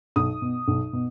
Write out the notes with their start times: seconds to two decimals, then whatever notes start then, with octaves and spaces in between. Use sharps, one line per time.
0.16 B1 D#6
0.42 B2
0.68 B1
0.93 B2